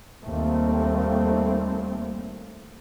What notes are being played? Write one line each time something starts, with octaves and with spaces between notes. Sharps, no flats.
D#2 G3 A3 A#3 C4